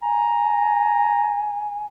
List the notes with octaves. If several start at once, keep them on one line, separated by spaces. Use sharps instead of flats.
G#5 A#5